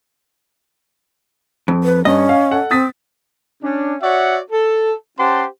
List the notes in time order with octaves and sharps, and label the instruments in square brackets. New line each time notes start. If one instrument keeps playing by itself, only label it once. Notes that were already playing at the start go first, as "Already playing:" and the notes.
[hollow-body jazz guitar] F2
[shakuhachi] B4
[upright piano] G2 [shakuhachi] C#4 [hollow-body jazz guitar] D#5
[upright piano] F5
A4 F#5
[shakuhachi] C4 [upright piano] D#6 A6 B6
[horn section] C#4 D4
F#4 C#5 D5 E5 F#5
A4
C#4 G4 C5 F#5 A5 C6